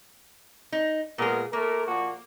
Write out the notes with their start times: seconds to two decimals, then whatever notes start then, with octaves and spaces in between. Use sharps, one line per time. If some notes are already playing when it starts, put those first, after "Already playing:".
0.72 D#4
1.18 A#2 G#3 B3 G#4 A#4
1.53 A3 A#3 A#4
1.87 A#2 F3 F#4